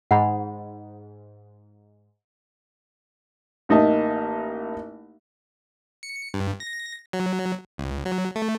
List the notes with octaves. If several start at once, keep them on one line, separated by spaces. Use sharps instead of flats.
G#2 F#5 B5
A1 A#3 D#4 D#5 E5 A5
C#7
G2
A#6
F#3
C#2
F#3
A3